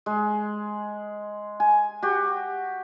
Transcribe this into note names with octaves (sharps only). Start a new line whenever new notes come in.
G#3
G#5
F#4 G4